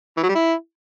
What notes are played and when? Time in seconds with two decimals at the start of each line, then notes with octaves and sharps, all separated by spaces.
0.17 E3
0.23 F#3
0.29 G3
0.35 E4